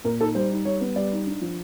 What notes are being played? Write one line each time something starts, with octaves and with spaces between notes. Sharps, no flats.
A#2 A#4
D#4 A4
G3 C5
D#4
G3 C#5
B3
G3 D5
D#4
D4
F3